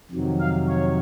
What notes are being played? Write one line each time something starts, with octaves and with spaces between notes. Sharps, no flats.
F2 C3 D#3 F#3
F5
C#5